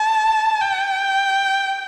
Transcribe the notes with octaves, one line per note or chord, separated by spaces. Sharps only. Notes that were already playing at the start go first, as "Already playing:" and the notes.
Already playing: A5
G5